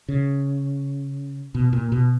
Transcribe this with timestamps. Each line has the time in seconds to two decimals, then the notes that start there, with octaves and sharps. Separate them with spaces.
0.08 C#3
1.55 B2
1.73 A#2
1.92 B2